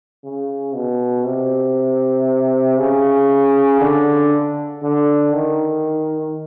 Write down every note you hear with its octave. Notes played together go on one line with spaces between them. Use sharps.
C#3
B2
C3
C#3
D3
D3
D#3